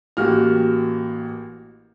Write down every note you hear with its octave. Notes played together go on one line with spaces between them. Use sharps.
A1 A#3 F#4 G4 F6